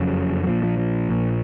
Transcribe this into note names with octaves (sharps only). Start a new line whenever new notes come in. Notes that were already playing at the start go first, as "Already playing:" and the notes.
Already playing: F#1 F2 C#3 F#3
F#3
A#1 A#2 F3
F3
F3
A#1 A#2